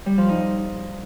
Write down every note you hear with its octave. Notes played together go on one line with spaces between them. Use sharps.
G3
F3
D#4